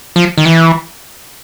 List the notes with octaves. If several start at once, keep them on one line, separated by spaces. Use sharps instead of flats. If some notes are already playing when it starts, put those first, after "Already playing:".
F3
D#3
E3